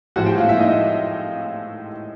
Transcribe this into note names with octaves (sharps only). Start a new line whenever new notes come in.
A2 F3 G#3 F#4 F#5
G4 G5
F4 F5
E4 E5
D#4 D#5